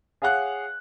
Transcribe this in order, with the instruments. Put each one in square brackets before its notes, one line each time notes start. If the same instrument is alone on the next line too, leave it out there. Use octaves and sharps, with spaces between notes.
[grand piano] G#4 C#5 F5 F#5 F#6